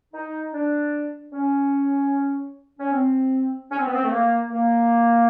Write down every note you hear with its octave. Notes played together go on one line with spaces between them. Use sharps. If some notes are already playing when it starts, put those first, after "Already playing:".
D#4
D4
C#4
C#4
C4
C#4
C4
B3
C4
A3
A#3
A#3